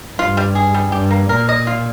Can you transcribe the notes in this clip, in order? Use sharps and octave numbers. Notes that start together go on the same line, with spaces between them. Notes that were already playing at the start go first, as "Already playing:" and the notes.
G2 F4
G3
G#4
G3
G2 G4
A#3
A#2 A#4
D#5
F4